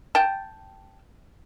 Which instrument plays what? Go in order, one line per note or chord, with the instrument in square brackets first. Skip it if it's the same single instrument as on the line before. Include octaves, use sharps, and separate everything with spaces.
[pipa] G5 A5